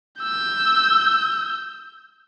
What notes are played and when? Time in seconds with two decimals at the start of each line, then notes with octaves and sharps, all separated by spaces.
0.21 E6 G6